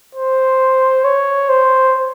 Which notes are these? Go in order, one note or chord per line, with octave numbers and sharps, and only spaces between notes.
C5
C#5
C5